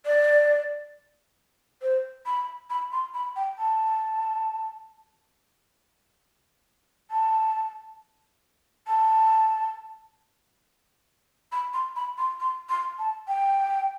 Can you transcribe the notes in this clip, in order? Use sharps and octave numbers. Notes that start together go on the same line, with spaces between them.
D5
C5
B5
B5
C6
B5
G5
A5
A5
A5
B5
C6
B5
C6
C6
C6
A5
G5